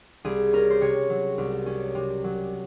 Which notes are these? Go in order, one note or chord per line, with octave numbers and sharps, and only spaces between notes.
C2 G#4
C#4 A#4
C5
C3 C#5
F#3
C2
C#4
C3
F#3